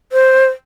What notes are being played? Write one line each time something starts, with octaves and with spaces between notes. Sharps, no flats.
C5